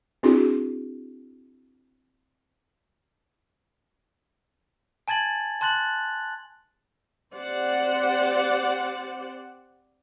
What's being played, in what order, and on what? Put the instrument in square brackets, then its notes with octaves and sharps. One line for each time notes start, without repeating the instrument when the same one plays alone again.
[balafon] C4 D4 E4 F#4 G#4
[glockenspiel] G#5 A5 G#6 A6 F#7
A5 C6 F#6 A6 F#7
[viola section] C4 G4 C5 D5 F#5